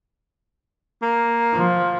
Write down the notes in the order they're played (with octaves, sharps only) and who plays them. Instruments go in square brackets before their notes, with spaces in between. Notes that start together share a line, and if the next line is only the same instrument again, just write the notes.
[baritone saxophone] A#3
[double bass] F3